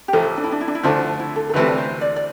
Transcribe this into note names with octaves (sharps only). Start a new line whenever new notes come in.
G4
A1 A2 F3 A4
D4
E4
D4
E4
D4
E4
D2 D3 F3 A3 F4
E4
A4
A4
D2 C3 E3 A3 B4
D5
C5
D5
D5